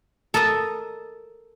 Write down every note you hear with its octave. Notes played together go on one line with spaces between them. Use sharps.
A4 A#4 D#5 A#5